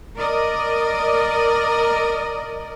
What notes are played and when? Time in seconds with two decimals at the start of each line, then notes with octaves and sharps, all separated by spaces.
0.18 A#4 D5 D#5